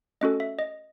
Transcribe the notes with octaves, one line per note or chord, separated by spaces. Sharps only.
A3 C#4 F#4 A4 D#5
E5
D#5